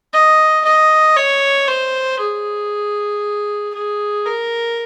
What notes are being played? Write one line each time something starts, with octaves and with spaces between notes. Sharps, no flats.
D#5
D#5
C#5
C5
G#4
G#4
A#4